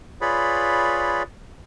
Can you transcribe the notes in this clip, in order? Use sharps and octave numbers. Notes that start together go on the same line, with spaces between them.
F4 G#4 B4 C#5 D5 B5